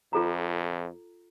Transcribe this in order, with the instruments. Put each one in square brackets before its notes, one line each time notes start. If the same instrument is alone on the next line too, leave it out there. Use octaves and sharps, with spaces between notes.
[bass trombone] F2 [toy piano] F4 A4 A#5